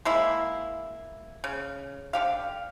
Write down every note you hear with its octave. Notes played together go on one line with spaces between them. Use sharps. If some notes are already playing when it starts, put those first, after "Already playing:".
G#3 A#3 E4
C#3
D3 G4 F5